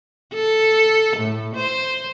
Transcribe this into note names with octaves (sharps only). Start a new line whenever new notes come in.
A4
A2
C5